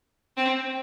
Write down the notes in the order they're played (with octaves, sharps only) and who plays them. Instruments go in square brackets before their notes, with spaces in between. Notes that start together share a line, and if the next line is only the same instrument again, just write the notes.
[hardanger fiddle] C4